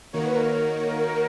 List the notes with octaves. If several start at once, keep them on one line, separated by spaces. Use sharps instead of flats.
D#3 A#3 D#4 F#4 A#4 C#5
B4
A#4